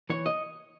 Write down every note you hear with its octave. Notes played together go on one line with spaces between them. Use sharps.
E3 C#5
D#5